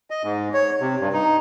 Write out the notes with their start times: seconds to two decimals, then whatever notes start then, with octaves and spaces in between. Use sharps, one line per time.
0.10 D#5
0.24 G#2
0.54 C#5
0.81 C3
1.00 G2
1.13 D#4